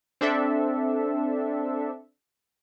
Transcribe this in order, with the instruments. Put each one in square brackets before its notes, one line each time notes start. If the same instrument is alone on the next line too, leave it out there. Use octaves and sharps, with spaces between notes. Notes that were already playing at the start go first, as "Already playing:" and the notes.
[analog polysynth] C4 D4 A4 E5